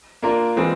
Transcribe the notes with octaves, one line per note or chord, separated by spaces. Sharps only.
A#3 D4 F4 A#4
E3 G#3 C4 F4 G#4